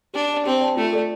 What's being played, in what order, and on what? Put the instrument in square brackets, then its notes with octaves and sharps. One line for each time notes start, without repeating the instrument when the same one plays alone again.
[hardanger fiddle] D4 [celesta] G4
[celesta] D5 A5
[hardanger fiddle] C4 [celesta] G4
[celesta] D5 A5
[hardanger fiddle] A3 [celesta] F4
[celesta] A4 D5